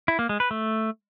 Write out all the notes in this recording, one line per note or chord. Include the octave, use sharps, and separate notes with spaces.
E4
A#3
G#3
B4
A3